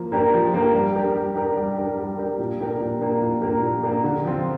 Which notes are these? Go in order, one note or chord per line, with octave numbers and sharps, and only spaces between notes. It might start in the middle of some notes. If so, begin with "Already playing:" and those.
Already playing: F3 A#3
A#3 D4 G4 A#4
F3
A#3 D4 G4 A#4
G3
D4 G4 A#4
G3
D4 G4 A#4
G3
D4 G4 A#4
G3
D4 G4 A#4
A#2
A#3 D4 G4 A#4
A#2
A#3 D4 G4 A#4
A#2
A#3 D4 G4 A#4
A#2
A#3 D4 G4 A#4
D3
F3 C4 F4